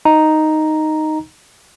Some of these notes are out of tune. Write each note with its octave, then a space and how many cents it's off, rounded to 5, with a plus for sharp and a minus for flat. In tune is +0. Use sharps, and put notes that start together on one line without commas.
D#4 +0 A#5 +0